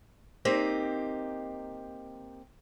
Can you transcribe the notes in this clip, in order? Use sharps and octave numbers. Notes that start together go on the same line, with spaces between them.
A#3 C4 D#4 G4